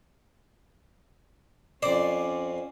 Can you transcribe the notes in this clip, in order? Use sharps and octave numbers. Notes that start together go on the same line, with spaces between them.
F2 C#4 C5 D5